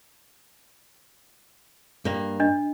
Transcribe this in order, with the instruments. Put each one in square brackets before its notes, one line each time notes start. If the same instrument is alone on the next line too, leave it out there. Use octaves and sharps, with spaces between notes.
[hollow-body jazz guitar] G2 A#3
[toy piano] D4 D#5